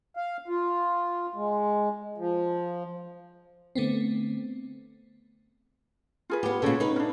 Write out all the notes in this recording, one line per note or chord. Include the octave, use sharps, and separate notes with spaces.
F5
F4
G#3
F3
D3 A3 B3 C4
F4 G#4 B4
B3 G4
A#2 C#3 A4 C#5
D#4 B4
C#4 D4